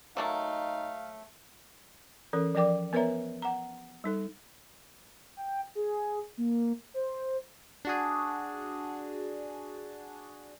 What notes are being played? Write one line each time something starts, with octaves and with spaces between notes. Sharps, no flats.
F#3 A3 A#3 D#4 F5
E3 C#4 A4 A#4
F3 A#4 D5 G5 D6
B3 A#4 B4 C#5 E5 A#5
F#5 A#5
G3 D#4 A4
G5
G#4
A#3
C5
D4 F#4 G#4